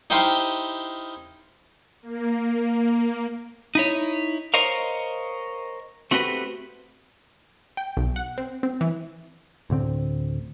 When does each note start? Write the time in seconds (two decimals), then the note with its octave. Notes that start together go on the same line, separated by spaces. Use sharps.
0.10 D#4 E4 G4 C5 F5 G5
2.03 A#3
3.75 D#4 E4 C#5
4.54 A#4 C5 C#5 D#5 F5
6.11 A3 C4 F#4 G4 A#4 B4
7.77 G5
7.97 B1
8.16 F#5
8.38 C4
8.63 C4
8.81 E3
9.70 D2 A2 D3 C4